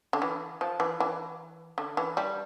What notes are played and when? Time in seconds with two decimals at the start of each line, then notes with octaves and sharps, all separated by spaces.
0.13 D3
0.22 E3
0.61 F3
0.80 E3
1.00 E3
1.78 D3
1.97 E3
2.17 G3